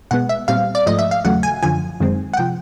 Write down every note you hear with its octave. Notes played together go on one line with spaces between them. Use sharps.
B2 G#3 B3 F#5
E5
A#2 G3 C4 F5
D5
G#2 F3 A3 D#5
E5
F5
E2 C#3 F#3 A3 F#5
G#5
F#2 D3 F3 G#5
F#2 D#3 G#3 C4
F#5
C3 F3 G5